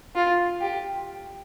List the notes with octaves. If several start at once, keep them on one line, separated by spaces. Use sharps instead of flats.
F4
G4